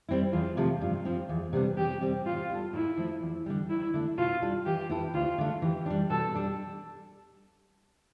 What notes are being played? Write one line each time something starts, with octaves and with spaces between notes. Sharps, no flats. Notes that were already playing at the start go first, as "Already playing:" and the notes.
G3 C4 E4
E2 F4
C3 F3 A3
G2 F4
F3 C4
E2
C3 G3 B3 D4
E2 G4
C3 G3 C4
A2 F4
G3 B3 E4 A4
A2 E4
F3 A3
E2
D3 G3
D2 E4
D3 A3
B2 F4
G3 D4 A4
E3 G4
B3 E4 A4
D2 F4
D3 A3
E3 G4
G3 D4
B2 A4
G3 D4 A4